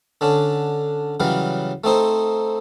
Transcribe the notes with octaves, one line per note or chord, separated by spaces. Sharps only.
D3 C#4 D4
C#3 E3 F#3 G3 F5
A3 C4 D#4 C5